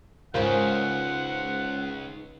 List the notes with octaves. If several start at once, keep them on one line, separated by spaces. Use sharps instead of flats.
C#2 G#2 C#3 F4 A#4 C5 F#5